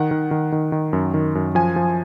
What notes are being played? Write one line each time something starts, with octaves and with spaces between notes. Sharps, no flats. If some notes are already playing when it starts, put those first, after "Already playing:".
Already playing: D#3 F#5
D#3
D#3
D#3
D#3
F#2
D#3
F#2
F3 G#5
F3